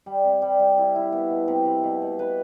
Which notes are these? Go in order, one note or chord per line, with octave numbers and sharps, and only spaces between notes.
G3
C3
G3
G3
E4
E4
B3
B2
C3
C3
B2
B2
B4